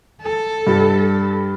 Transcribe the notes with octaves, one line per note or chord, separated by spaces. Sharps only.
A4
G2 G3